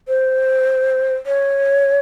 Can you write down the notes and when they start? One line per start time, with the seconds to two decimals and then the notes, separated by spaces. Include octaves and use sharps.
0.08 C5
1.26 C#5